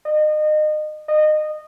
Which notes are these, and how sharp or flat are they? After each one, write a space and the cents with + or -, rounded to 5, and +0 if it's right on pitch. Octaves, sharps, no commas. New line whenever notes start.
D#5 -30
D#5 -25